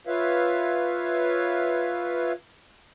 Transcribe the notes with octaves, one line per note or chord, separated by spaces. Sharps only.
F4 B4 C#5 E5 F5